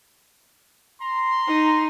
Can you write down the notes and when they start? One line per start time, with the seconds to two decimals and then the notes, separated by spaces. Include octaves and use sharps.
1.01 A#5 C6
1.48 D#4